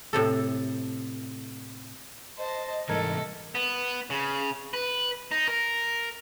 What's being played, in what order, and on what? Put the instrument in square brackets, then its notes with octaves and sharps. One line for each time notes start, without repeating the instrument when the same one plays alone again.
[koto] A2 C3 A4
[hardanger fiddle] C5 A5 [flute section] D#5
[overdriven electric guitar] C2 E3 [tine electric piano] G#2 A#4 G#6 [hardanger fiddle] A4
[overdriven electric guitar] B3
C#3
B4
D#4
A#4